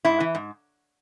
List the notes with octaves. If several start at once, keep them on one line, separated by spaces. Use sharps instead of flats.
G#2 E4
E3
G#2